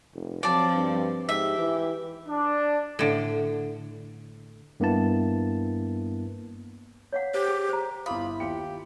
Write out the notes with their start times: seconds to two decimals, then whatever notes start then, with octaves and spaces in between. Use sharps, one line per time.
0.13 F1
0.43 F3 F#3 C4 D5 A5
0.74 G2
1.29 G#2 G4 E5
1.58 E3
2.29 D4
2.99 A2 D3
4.80 G2 A#3 B3 E4 A5
7.13 C#5 F5 F#5
7.34 G4 C5
7.48 G#4
7.69 C5 A#5
8.06 G1 E4 F4 B5 D6 D#6
8.40 D#2 F4 G4 C#7